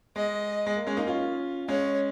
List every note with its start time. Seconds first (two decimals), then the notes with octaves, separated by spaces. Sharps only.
0.16 G#3 D#5
0.66 G#3
0.77 A#3
0.87 G#3 C#4
0.97 A#3 D#4
1.07 C#4 F4
1.68 G#3 C#4 C#5